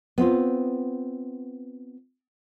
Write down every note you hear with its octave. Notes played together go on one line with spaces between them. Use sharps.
B3 C4 F4